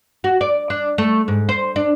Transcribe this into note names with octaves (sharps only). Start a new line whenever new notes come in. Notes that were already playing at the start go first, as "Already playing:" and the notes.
F#4
D5
D4
A3
G#2
C5
D4